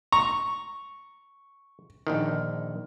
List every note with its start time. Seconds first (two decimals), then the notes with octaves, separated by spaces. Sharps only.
0.12 A#5 C#6
2.07 A#1 D3 D#3